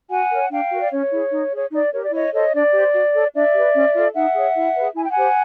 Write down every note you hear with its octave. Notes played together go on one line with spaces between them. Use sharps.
F#4 F#5 G#5
A#4 C#5
D4 F5 G5
F#4 A#4
D5
C#4 C#5
E4 G#4
D#4
G#4 C#5
D#4 D5
G4 A#4 C#5
D5
E4 C#5 D#5
A4 C5 C#5 D#5
D4 D5
G4 C5
F#4
A4 C#5
D4 D5 E5
G4 B4
C#4
F4 A4
D#4 E5 F#5
G#4 C#5
E4
G#4 B4
E4 G#5
G5
F#5 G#5
G4 C5